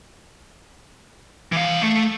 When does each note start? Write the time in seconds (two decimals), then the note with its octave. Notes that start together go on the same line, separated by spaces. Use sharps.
1.52 E3 F5
1.82 A3